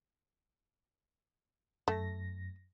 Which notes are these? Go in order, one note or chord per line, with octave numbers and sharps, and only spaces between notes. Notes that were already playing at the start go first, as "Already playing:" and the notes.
F#2 A3 A#6